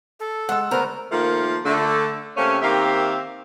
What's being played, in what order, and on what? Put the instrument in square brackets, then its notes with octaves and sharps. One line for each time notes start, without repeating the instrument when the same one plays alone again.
[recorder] A4
[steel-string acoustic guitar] G#3 [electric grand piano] F#5 E6
[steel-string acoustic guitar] D2 C5 A#5 [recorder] B3 [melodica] A#4
[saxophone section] D#3 F3 A3 A#3
D3 A3
C3 A3 A#3 C4 C#4
D#3 A#3 C4 G4 E5 F5